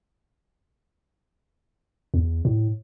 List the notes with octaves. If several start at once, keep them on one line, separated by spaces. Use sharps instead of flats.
E2
A2